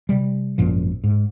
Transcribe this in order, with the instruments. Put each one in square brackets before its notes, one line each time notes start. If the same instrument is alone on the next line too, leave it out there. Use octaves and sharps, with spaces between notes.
[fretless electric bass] C3 G3
G#1 F#2 A#2 F3
G#2